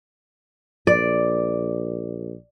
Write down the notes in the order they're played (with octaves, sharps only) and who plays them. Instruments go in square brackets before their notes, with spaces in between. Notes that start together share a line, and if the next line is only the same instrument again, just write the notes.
[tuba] A#1 [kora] D5